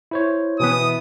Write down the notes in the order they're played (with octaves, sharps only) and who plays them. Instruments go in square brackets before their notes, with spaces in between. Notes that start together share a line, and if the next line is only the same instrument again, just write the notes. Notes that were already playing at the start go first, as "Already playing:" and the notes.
[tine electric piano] E4 C5 C#5
[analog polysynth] B2 E3 B3 [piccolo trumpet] D#6